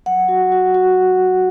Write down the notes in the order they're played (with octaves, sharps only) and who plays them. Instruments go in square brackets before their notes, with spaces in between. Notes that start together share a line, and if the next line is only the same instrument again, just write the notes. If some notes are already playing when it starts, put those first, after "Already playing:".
[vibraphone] F#3 F#5
F#4
F#4
F#4